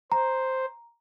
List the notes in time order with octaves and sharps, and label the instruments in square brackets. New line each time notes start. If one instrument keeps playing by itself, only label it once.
[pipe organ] C5 [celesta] A#5